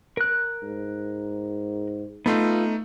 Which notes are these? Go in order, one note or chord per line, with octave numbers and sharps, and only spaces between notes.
A#4 F#6
G#2
A3 B3 D#4 F4